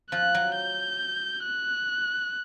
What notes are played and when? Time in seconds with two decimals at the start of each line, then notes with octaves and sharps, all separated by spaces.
0.12 F3 F#6
0.34 F#3
0.56 G6
1.45 F#6